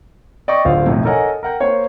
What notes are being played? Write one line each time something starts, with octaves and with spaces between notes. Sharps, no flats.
D5 D#5 G5 C#6 D#6
D1 D3 F4 C5 F5
B1 F2 A2
A4 A#4 C#5 D#5 F#5 G#5
A#4 F#5 G5
A#3 C5 C#5